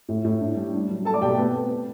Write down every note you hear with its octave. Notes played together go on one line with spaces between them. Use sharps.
A2
A2
D4
G3
D4
F#3
A3 A4 A5
D5 D6
B2 G4 G5
A3 A4
B3 C4 B4
C4
B3